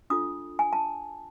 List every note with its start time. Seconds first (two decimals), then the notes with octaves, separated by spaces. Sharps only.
0.10 D4 F4 A4 D#6
0.59 G#5
0.73 A5